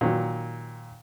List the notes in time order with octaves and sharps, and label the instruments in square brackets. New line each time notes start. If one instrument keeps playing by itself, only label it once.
[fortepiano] A#2 D#3 F#3